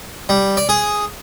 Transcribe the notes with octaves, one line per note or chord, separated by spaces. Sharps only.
G3
D5
G#4